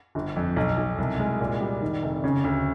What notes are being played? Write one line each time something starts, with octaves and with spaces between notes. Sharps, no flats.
G1
F2
B1
B1
C2
G#3
A#2
G3
D#3
F1
C#3
D2